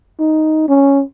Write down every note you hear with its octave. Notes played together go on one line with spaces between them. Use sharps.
D#4
C#4